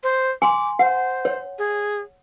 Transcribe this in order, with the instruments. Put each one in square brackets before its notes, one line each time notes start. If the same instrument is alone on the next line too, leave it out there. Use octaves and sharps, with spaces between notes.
[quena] C5
[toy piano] G#5 C6 [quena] D6
[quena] C5 [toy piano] F#5
[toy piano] C#5
[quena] G#4